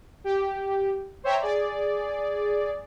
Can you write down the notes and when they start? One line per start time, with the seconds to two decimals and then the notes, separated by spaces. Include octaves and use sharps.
0.24 G4
1.24 C5 C#5 E5 G5 A#5
1.41 G#4 D5